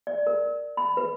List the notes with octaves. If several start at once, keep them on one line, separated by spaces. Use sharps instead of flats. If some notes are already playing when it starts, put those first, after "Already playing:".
D5
A#4
B5
B4